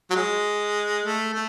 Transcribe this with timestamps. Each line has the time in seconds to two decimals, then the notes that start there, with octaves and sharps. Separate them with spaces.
0.10 F#3
0.15 G#3
1.04 A3
1.34 A3